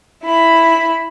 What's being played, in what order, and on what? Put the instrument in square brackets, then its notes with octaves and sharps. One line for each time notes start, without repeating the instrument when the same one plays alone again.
[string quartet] E4 B5